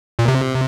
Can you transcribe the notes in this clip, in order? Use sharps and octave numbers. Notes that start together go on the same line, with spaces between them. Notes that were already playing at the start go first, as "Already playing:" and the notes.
A#2
C3